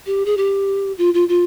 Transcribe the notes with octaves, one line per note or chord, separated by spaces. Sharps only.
G4
G#4
G4
F4
F4
F4